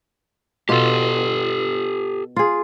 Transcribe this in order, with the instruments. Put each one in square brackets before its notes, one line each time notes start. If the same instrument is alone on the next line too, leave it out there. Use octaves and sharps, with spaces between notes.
[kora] B2 F4 [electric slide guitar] G4 A4
[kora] F4 G#4